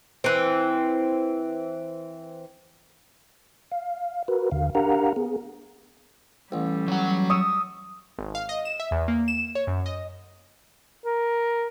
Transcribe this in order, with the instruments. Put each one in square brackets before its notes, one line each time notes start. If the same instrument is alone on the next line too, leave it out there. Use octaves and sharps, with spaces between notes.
[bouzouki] E3 C4
[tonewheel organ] F5
F#4 A#4 B4
D#2 D3 F5
D4 G4 A#4 F5 F#5 A#5
B3 G#4
[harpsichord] A1 [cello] G3
[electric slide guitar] F#3 F#5
[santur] C#6 D#6 E6
[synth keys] G#1
F5
D#5
E7
E5
E2
A#3
E7
C#5
F#2
D#5
[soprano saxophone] A#4